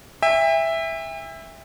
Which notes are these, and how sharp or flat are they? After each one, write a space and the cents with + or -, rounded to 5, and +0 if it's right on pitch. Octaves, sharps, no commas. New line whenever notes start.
E5 +0 G5 +45